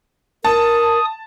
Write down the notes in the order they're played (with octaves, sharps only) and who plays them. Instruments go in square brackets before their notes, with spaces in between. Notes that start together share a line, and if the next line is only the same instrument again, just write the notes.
[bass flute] A#4 [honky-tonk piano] A5 [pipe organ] D#6